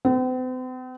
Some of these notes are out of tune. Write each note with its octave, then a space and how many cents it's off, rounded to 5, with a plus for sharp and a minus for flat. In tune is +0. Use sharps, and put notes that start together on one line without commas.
C4 -45